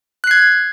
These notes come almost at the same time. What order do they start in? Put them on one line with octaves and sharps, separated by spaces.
F#6 C7 G#6